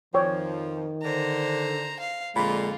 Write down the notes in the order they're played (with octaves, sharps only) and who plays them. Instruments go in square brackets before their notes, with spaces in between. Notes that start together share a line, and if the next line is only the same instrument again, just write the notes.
[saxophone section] F2 F3 [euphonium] D#3 [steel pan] C#5 D5 G5
[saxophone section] D3 [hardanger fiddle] C5 A#5
[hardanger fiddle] F5
[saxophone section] F2 A#2 D3 [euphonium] G#3 [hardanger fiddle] F4 [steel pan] B5